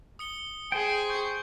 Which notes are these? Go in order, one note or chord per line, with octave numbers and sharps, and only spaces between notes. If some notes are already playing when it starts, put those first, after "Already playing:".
D#6 C#7 G7
G#4 C5 G5
C#6 G6